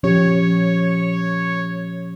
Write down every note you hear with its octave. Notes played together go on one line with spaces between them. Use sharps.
A#2 F3 C#4 G4 C#5